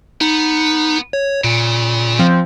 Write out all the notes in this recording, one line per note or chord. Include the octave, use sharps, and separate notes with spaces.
B3 D#4
C#5
A#2 C#3
F3 C4